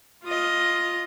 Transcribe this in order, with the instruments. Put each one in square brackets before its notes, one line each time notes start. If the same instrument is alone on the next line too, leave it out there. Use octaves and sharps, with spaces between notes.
[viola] F4 D#5